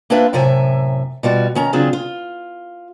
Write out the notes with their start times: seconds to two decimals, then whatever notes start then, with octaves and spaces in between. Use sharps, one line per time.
0.10 A#3 C4 D4 F4 B4 E5
0.33 F#2 A2 C3 E5 G#5
1.23 B2 G3 F4 F#4
1.55 D#3 C#4 A#5
1.73 C#3 F#3 C4 D4 F4 G#4
1.93 F4